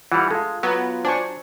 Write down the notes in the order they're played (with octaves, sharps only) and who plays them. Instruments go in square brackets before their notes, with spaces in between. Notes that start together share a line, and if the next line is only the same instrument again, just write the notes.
[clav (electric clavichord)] E3 G3 [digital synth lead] F4 [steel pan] F#5 B5
[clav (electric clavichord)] G#3 [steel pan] A4 F5
[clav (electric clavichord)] F#3 [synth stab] B3
[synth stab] D4 [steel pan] C5 G#5 C#6